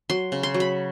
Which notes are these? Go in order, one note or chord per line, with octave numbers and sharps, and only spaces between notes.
F#3 C6
C#3
C6
F#3
B5